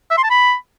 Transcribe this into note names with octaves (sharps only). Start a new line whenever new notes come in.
E5
C6
A5
B5